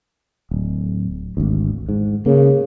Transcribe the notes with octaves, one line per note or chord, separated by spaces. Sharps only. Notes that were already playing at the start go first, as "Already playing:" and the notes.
D1
G#1 D2
G#2
C#3 A#3